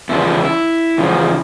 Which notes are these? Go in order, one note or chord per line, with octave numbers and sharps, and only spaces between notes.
E2 C#3 F3 E4
E2 C#3 F3